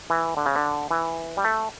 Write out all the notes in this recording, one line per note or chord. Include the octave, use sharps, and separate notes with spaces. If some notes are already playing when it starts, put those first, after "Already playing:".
E3
D3
C#3
D3
E3
G3
A3